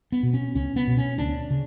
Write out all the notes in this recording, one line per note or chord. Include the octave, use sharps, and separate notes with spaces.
B3
B2
C#4
C#2 C#4
B3
B2
C#4
D2 D4
C#3